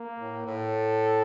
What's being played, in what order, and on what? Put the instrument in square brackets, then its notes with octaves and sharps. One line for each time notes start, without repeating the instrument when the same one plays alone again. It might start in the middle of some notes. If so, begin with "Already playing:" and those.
Already playing: [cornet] A#3
[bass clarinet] A2
[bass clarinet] A2 [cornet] A4